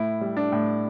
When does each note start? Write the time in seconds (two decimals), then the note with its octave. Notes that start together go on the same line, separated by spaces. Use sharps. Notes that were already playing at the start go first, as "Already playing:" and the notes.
Already playing: A2 E4
0.21 G3
0.37 D4
0.52 A2